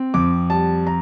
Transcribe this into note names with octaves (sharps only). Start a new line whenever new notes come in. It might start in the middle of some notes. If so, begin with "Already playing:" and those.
Already playing: C4
F2 D6
G3 A5
A#5